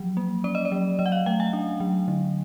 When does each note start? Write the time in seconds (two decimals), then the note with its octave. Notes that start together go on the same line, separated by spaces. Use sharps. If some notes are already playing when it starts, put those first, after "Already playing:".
Already playing: F3 F#3
0.17 A#3
0.44 C#4 D5
0.55 D#5
0.65 D5
0.72 F#3
0.99 F#3 D#5
1.06 F#5
1.12 F5
1.26 A3 G5
1.40 G#5
1.53 D4
1.80 F#3
2.08 D3